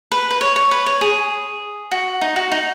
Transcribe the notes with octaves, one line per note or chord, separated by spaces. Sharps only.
B4
B4
C#5
C#5
B4
C#5
G#4
F#4
D#4
F#4
D#4